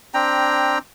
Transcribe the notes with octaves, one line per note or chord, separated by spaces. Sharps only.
C4 D4 G5 A#5